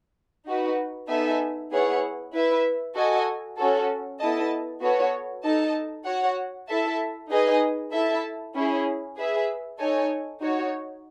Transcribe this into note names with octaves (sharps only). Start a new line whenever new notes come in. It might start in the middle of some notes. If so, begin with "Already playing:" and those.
D#4 F#4 B4
B3 D#4 A4 E5 G#5
B3 E4 G#4 C#5 F#5
E4 B4 E5
F#4 A4 D#5 G#5
C#4 F#4 A4
B3 E4 A4 D#5 A5
B3 F#4 A4 C#5
D#4 A4 D#5 A5
F#4 C#5 F#5
E4 A4 E5 A5
D#4 G#4 B4 D#5 G#5
E4 A4 E5 A5
C#4 E4 G#4
G#4 B4 E5
D#4 A4 C#5 G#5
D#4 F#4 C#5